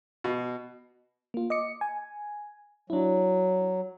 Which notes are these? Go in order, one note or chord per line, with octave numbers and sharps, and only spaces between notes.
B2
A#3 F4
D#5 D6 C#7
G#5
F#3 D4 E4